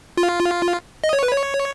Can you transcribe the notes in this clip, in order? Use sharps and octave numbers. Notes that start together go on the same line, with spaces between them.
F4
D#5
C#5
B4
C#5